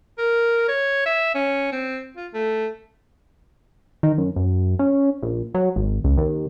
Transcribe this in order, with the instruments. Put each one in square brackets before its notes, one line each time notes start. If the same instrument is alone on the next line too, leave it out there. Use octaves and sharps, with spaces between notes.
[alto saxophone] A#4
C#5
E5
C#4
C4
F4
A3
[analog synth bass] D#3
F#2
F#2
C#4
A#1
F#3
G#1
C#2
D#2